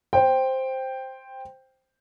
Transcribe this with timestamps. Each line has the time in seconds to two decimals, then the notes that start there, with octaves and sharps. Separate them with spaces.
0.13 C5 G5